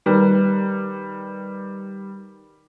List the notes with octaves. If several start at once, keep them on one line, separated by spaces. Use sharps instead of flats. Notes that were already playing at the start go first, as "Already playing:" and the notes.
D#3 G3 B4